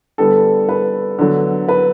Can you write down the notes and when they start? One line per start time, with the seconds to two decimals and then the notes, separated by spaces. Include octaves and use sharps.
0.18 D3 G3 B3 A4
0.69 B4
1.19 D3 F#3 B3
1.68 B4